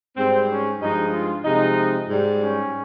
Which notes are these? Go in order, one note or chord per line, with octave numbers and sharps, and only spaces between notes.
G#2 G3 C4
C#4
G2 F3 G#3 D#4
F4
C3 F3 G#3 D#4
G#2 G3
C#4